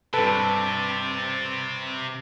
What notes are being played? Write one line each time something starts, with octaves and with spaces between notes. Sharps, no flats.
G2 C3 A4 B4 A6